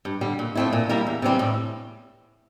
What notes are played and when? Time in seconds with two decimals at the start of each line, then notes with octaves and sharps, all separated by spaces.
0.05 G2
0.21 D3 G3
0.39 A#2
0.55 F3 A3 C4 E4
0.73 A#2
0.89 G3 A#3 E4 A#4
1.07 E2
1.22 C3 E3 G3 C4
1.39 A2